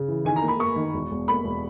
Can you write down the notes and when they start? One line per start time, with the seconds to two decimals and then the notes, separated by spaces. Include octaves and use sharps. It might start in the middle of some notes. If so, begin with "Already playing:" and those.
Already playing: C#3
0.08 E3
0.25 D#3 G#5
0.36 A#5
0.42 A#3
0.48 B5
0.59 A#3 C#6
0.76 D#3
0.94 E1
1.11 E1
1.28 A#3 B5
1.44 E1